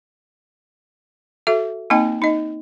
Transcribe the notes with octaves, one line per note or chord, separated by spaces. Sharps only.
F#4 A4 E5
A#3 C4 D#4 D#5 G5
D#4 D#5